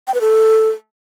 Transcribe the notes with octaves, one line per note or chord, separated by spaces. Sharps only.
G5
B4
A4